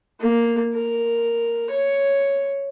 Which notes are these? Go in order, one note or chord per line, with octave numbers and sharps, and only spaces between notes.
A#3
A#4
C#5